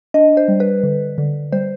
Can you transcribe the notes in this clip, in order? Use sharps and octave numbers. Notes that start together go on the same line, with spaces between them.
D4 D#5
C5
G3
B4
D3
D3
G3 C5